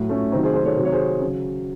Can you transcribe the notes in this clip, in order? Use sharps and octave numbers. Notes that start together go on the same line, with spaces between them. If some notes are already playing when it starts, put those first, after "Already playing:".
Already playing: A2 F#3
A3 C#4
C3 D#3 F#3 C4 D#4
G#4 C5
G#4 C5
A4 C#5
C3 D#3 F#3 C5
C#5
G#4 C5
C#3 F#3